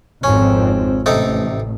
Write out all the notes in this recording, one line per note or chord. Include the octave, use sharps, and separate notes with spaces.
G#1 F2 C4 C#4
A1 C3 D#4 A4